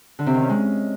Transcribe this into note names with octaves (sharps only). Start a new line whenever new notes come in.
D3
C3
D#3
C#4
G#3